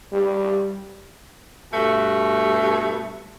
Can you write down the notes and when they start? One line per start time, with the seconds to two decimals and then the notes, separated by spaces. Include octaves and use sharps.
0.12 G3
1.73 G2 B2 A3